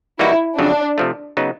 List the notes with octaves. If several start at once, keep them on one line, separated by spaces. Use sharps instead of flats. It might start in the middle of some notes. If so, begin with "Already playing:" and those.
E3 G3 A#3 D#4 E4 F#4
F2 C#3 F#3 D4
C3 F3 A3
C#3 F#3 B3 D#4